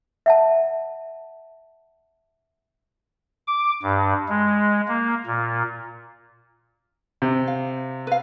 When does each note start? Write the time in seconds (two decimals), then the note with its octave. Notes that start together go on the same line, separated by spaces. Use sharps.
0.26 E5 F#5 A5
3.48 D6
3.83 G2
4.29 G#3
4.88 A#3
5.26 A#2
7.22 C3
7.48 F5
8.07 B4 F5